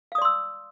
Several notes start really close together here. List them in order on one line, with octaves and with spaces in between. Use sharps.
F5 D#6 D5 C6 E6